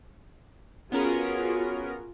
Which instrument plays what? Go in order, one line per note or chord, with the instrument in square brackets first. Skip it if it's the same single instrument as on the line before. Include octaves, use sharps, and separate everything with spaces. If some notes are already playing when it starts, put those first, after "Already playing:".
[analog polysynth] B3 C#4 A#4 [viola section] F4 F#4 G#4